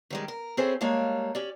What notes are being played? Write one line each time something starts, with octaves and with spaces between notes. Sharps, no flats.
D#3 G3 G#3
A#4
C4 C#4 E4 G#4 A4 C5
G3 G#3 A#3 C#5 F5 A5
C#4 G4 D5